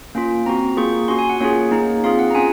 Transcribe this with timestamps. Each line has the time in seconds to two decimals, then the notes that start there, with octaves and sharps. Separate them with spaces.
0.15 A#3 C#4 F4
0.46 C4 F#4 A#5
0.77 A#3 F4 G#4 C#6
1.08 C#4 F#4 C6
1.19 G#5
1.29 F#5
1.40 A#3 C#4 F4 G#4 C#5
1.71 A#3 D#4 G#4
2.04 C4 F4 G#4 F5
2.19 F#5
2.30 A#5
2.35 C#4 F4 G#4 G#5